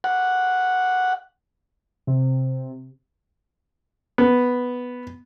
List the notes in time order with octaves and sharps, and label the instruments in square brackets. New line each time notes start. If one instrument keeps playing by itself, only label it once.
[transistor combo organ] F#5
[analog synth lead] C3
[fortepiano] B3